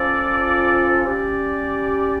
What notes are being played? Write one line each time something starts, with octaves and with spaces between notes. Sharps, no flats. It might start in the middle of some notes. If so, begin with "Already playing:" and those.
Already playing: F3 C#4 F4 A4 D5
G3 C#4 G4 D5